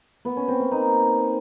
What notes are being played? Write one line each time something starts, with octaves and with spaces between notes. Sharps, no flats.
B3
C#4
C4
A#3
D#4